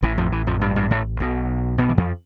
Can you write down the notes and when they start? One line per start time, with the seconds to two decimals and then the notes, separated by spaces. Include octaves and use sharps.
0.02 A1 A2 E3
0.18 F2 F3
0.32 E3
0.47 F2 F3
0.61 G2 G3
0.76 G2 G3
0.91 A2 A3
1.20 B1 B2
1.78 B2 B3
1.89 E3
1.97 F2 F3